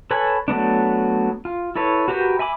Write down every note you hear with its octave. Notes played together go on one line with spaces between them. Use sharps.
A4 B4 C#5 G#5 B5
F#3 A3 B3 D4
F4
E4 A4 B4 C#5
F#4 G4 A#4 B4 G5
E5 G#5 B5 D6